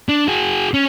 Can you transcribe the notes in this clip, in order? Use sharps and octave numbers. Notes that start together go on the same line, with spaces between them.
D4
F#4 G#4
C#4